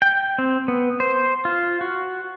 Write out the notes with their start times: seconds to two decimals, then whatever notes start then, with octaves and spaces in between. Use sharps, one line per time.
0.02 G5
0.38 C4
0.68 B3
1.00 C5
1.45 F4
1.81 F#4